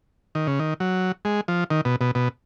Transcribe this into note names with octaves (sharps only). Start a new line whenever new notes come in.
D#3
C#3
D#3
F#3
G#3
F3
D#3
B2
B2
B2